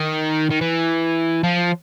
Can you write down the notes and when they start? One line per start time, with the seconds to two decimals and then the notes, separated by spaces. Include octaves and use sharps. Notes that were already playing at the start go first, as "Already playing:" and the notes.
Already playing: D#3
0.51 D#3
0.61 E3
1.43 F3